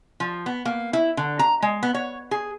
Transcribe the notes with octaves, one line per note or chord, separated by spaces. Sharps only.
F3
B3
A#3
E4
D3
A#5
G#3
B3
C#5
G#4